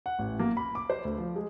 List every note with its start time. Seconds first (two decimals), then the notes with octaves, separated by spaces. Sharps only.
0.06 F#5
0.19 A1
0.39 A#3
0.57 B5
0.75 D6
0.90 C5
1.05 D2
1.18 F3
1.36 G#3